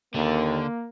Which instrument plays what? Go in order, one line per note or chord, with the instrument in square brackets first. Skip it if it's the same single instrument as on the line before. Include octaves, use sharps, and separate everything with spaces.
[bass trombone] D#2 [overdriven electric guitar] D3 [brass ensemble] A#3